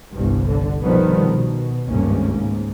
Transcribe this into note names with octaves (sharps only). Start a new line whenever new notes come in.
G1 C2 G2
D3
B2 D#3 F3 G3 B3
B2
G#1 C#2 G2 A3 A#3 C#4
C#2 G#2